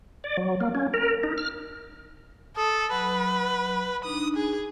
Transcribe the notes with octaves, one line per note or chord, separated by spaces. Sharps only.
D5
F#3
A#3
C#4
A#4
D#4
F6
A4 D#6
F#3 B4
D4 D#4 D#6
G#4